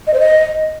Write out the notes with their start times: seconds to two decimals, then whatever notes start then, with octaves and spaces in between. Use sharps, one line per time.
0.07 D#5
0.14 C5
0.20 D#5